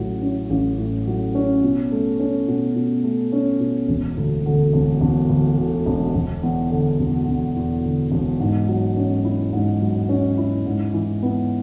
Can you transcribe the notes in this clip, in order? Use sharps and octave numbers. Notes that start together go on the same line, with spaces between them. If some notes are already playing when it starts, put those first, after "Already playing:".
Already playing: A1 A2 F#3
C#4
A1
A2
F#3
C#4
B2
A3
C#4
B2
B2
A3
C#4
B2
E1
D2
D3
E1
E1
D2
D3
E1
E1
E2
D3
E1
E1
E2
D3
E1
G#2
F#3
C#4
E4
G#2
F#3
C#4
E4
G#2
E3
B3